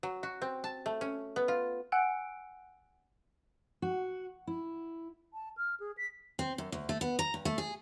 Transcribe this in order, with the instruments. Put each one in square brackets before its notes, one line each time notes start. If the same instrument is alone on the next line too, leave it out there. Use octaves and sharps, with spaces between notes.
[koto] F#3
F#4
C4
A5
A3
C#4
B3
F4
[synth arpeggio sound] F#5 G#5 E6 F#6 C#7 D7
[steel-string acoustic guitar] F#4
E4
[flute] A5
F6
G#4
B6
[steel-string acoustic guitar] C4
F#2
D2
A3
B3
A#5
G2
A3
G#4